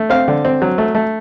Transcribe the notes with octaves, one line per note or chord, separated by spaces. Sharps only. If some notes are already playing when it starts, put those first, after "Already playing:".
Already playing: A3
C4 F5
D3
C4
F#3
A3
A3